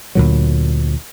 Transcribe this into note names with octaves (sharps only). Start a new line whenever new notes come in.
D2 A#2 F#3